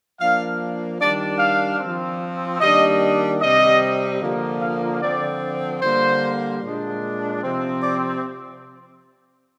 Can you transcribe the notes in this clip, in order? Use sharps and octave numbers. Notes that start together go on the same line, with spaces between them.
F3 A#3 D4 F5
D#3 G3 D4 D5
F5
F3 C4
D#3 G3 A#3 D4 D#5
C3 G3 C4 D#5
D3 F3 A#3
F5
D3 F3 C4 D5
D3 G3 A#3 C5
A#2 G#3 D4
C3 F3 C4
D5